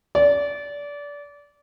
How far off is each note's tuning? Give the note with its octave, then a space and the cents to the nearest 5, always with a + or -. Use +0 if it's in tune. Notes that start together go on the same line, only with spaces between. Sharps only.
D5 -25